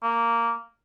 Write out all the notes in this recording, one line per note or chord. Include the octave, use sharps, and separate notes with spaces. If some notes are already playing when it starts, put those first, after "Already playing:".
A#3